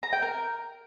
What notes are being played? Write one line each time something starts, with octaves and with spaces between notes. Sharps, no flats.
A#5
G5
A#4